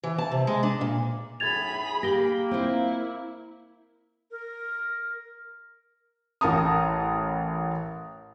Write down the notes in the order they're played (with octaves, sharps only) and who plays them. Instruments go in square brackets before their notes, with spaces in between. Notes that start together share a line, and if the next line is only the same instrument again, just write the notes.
[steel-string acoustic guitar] E3
A5
C3
G#3
D4
A#2
[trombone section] B1 F#2 A2 [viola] G#4 B5 [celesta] G#6 A6 F7
[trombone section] A#3 [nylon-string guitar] G4 [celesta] A#6 G7
[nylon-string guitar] C4 F4 C5 [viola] E4
[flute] A#4
[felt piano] A1 A#4 A5 A#5 D#6